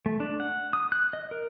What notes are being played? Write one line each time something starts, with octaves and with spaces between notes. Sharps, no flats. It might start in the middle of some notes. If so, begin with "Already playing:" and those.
A3
D4
F#5
D#6
F#6
D#5
A#4